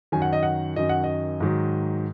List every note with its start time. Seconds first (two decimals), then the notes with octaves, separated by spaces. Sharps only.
0.12 F#2 D#3 F#3 G#5
0.22 F#5
0.33 D#5
0.43 F#5
0.76 F#2 D#3 F#3 D#5
0.89 F#5
1.04 D#5
1.40 G#2 D#3 F#3